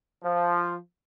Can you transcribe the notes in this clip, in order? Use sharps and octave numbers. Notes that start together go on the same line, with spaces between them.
F3